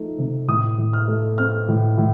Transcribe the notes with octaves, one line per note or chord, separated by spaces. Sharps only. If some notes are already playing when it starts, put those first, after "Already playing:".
Already playing: F3 A3 D#4
C3
A2 D#6
A2
F6
A3
C4 F6
A2
A2